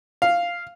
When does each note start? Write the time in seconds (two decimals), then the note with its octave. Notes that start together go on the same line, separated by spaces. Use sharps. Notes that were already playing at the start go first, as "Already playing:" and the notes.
0.22 F5